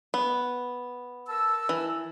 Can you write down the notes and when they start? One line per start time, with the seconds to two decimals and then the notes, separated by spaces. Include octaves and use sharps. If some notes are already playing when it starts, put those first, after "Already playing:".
0.14 B3
1.29 A#4 A5 E6
1.69 E3